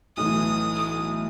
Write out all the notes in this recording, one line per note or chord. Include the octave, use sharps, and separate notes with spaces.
B1 A2 E3 D#6
D#6